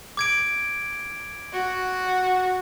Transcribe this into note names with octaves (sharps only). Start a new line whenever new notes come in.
D6 G#6 D7
F#4